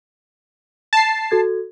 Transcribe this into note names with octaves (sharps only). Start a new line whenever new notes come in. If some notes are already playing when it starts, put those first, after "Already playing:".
A5 C7
F#4 A4 G#6